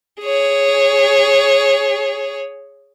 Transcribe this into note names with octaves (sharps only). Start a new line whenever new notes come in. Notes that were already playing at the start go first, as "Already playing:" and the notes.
G#4 C#5